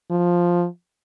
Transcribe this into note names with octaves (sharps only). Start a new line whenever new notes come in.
F3